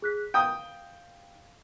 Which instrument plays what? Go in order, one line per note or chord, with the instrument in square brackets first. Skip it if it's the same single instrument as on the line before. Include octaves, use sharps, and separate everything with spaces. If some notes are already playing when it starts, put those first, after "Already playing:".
[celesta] G#4 F#6 B6
[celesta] F5 [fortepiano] G5 D#6